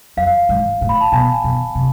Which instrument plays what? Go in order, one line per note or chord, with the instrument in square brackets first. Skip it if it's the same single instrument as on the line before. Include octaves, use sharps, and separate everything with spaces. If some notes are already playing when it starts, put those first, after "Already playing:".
[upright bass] F2 [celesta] F5
[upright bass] G#2
A2
[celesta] B5
A5
[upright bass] B2 [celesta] G#5
[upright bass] B2
C3